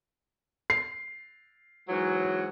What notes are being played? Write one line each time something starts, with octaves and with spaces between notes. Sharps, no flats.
C7
G#2 E3 F#3